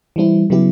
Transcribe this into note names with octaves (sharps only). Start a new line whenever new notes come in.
E3 G3 C4 E4
C#3 F#3 B3 E4 G4